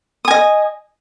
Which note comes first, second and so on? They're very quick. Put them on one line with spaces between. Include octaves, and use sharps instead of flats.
D#6 G#5 D#5